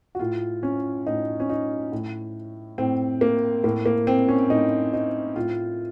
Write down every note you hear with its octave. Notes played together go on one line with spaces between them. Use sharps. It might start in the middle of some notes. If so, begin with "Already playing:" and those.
F#4
A2 F4
C#4
A2 D#4
C#4
D#4
A2
A2 C4
A#3
A2 A#3
A#3
C4
C#4
A2 D#4
D#4
A2 F4